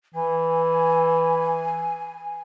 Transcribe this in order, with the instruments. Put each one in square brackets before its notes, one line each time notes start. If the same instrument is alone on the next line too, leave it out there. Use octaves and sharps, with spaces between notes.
[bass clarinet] E3 [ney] G#5